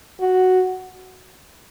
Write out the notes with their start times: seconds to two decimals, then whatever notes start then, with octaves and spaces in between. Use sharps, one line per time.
0.20 F#4